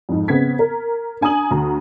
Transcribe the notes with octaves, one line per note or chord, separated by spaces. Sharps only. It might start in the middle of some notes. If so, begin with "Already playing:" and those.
F2 G#2
C#3 B3 C4 G#6 B6
A#4
D4 G#5 A#5 D#6 F#7
D2 A#5